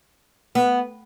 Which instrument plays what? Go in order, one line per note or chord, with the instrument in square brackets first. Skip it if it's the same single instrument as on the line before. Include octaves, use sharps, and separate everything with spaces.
[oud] B3